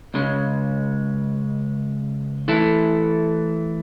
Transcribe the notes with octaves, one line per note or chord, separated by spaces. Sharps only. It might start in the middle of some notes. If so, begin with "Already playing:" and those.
C#2 C#3 G#3 C#4
E3 A3 E4 A4